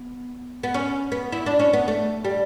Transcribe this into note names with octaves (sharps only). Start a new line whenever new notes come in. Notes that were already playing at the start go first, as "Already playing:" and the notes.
Already playing: B3
B3
C#4
B3
E4
D4
C#4
B3
A3
G3